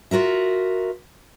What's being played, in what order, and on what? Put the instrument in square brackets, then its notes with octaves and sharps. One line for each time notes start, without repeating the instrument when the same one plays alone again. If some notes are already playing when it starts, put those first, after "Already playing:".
[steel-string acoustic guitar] F4 F#4 A#4 E5